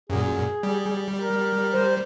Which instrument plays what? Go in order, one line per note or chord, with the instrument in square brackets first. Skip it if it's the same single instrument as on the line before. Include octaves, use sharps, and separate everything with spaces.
[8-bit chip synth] F#2 A#2 [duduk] G#4
[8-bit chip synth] G3
[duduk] A#4
[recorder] C5